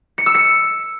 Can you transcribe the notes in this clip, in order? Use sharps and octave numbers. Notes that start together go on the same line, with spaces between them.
C#7
E6
C#7